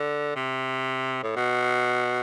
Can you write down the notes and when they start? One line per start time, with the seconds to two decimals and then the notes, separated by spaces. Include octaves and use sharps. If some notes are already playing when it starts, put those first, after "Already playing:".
Already playing: D3
0.36 C3
1.23 A2
1.36 B2